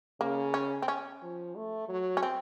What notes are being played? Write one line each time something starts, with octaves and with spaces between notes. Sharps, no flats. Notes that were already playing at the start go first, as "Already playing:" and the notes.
C#3 A#3
C#4
C4
C#4
F3
A3
F#3
C#4
C4